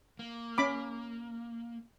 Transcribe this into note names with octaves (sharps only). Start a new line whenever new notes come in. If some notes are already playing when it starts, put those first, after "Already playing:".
A#3
C#4 B5 D6